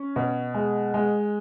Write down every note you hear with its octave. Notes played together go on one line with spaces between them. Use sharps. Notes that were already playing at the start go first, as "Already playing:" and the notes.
Already playing: C#4
B2
G#3
G#3